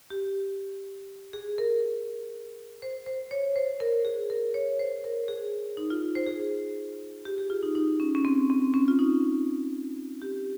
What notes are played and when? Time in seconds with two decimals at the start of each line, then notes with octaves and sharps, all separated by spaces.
0.10 G4
1.33 G#4
1.58 A#4
2.82 C5
3.06 C5
3.31 C#5
3.56 C5
3.80 A#4
4.05 G#4
4.30 A#4
4.54 C#5
4.79 C5
5.04 A#4
5.28 G#4
5.77 D#4
5.90 F4
6.15 C5
6.27 G#4
7.25 G4
7.38 G#4
7.50 F4
7.63 D#4
7.75 D#4
8.00 C#4
8.15 C#4
8.25 C4
8.50 C4
8.74 C#4
8.88 F4
8.99 D#4
10.22 G4